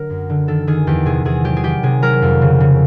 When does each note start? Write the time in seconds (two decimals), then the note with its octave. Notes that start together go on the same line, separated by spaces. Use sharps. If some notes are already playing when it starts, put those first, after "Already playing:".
Already playing: D3 F#3 A#4
0.10 F#2
0.30 D3
0.48 D#3 A4
0.67 D#3 G#4
0.87 E2 G4
1.06 C3 G#4
1.25 E2 G#4
1.44 F#3 G4
1.57 G#4
1.64 D#3 G4
1.83 C3 G#4
2.02 F#3 A#4
2.22 F2
2.41 C#3
2.60 C#3